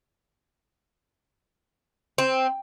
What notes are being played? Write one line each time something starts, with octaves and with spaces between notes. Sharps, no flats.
C4